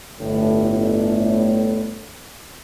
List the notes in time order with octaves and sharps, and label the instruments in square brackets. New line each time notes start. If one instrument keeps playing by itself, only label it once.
[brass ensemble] G1 A2